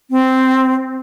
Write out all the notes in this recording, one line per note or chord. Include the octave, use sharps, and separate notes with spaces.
C4